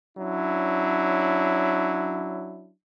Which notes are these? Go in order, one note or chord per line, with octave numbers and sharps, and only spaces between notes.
F#3 C#4 D4 E4